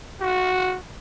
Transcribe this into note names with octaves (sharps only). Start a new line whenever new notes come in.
F#4